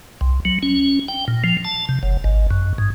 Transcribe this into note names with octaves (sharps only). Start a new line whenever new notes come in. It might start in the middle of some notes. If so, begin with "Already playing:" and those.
C2
F#3
C#4
G5
A#2
F3
A5
C3
F#1
G#1
F#2
G#2